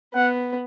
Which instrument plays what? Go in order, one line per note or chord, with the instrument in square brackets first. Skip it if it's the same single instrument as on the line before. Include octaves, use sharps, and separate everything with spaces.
[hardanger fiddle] B3 [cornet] F#5